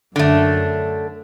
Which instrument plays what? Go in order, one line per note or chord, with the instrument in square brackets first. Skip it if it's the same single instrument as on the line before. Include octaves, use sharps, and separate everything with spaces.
[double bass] F#2 [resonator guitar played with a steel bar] D3 A3